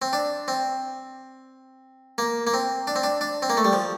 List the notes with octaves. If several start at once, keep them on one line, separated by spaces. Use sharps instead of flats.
C4
D4
C4
A#3
A#3
C4
D4
C4
D4
D4
C4
A#3
A3
G3
F3